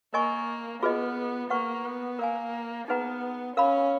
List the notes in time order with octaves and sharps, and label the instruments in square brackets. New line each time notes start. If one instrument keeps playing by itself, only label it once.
[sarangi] A#3 [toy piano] A#4 D#5 G#5 C#6
[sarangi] B3 [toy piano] F4 G#4 B4 D#5
[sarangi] A#3 [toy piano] B4 F#5 C#6
[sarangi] B3
[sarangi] A#3 [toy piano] A#4 F5 G#5
[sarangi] B3 [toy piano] D#4 G#4 B4 F#5 A#5
[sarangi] C#4 [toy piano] A#4 F5 B5